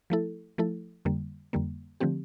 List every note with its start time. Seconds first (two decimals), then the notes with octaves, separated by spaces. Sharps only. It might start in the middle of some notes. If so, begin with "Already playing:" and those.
0.10 F3 A3 E4 A4
0.58 F3 A3 E4 A4
1.05 F2 D3 G3 A#3
1.53 F2 D3 G3 A#3
2.00 D3 F3 A3 C4 G4